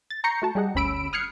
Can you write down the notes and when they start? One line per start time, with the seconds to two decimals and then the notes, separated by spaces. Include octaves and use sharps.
0.10 A6
0.24 A#5 C#6 G6 A#6 C7 C#7
0.42 A3 F#4 A5
0.55 G3 G4 G#4 D#5 F#5
0.75 G1 D2 C#4 B5 E6 D7
1.13 D#6 F6 F#6 G#6 C7 C#7